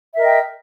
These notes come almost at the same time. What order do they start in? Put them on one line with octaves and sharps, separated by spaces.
E5 A#4 D#5 G5